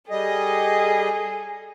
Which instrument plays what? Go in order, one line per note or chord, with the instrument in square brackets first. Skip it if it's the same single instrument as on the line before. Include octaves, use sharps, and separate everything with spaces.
[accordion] G3 D#5 [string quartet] G#4 A4